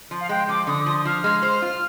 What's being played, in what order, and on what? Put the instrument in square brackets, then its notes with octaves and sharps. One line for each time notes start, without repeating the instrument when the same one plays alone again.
[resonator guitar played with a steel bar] F3
[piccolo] F5
[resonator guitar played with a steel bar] G#3 [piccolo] G5
[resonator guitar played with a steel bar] F3 [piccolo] D6
[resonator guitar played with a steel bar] D3 [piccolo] D#6
[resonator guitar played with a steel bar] F3 [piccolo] D#6
[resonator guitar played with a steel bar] F3 [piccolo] F6
[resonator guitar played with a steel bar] G#3 [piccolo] F6
[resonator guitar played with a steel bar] C5 [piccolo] F6
[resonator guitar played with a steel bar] F4